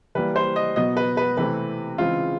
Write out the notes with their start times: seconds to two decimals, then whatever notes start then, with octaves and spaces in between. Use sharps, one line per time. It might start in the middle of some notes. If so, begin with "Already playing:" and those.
0.15 E3 G3 A#3 B4
0.36 C5
0.56 D#5
0.76 B2 F#3 B3 D#5
0.97 B4
1.17 B4
1.37 C3 E3 A3 C4 B4
1.98 C#3 E3 G#3 C4 F4